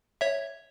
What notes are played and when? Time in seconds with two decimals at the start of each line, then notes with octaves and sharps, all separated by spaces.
0.21 C#5 E5